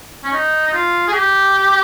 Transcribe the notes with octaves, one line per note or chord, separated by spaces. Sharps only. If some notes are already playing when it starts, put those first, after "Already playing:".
C#4
D#4
D#4
F4
G#4
G4